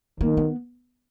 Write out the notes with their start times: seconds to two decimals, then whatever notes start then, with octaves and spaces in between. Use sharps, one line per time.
0.20 D#3 A#3
0.37 B3